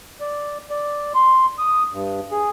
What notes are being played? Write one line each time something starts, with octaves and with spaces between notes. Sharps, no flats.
D5
D5
C6
D#6
G2
G#4